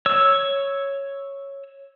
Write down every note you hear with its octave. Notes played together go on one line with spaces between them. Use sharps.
C#5 E6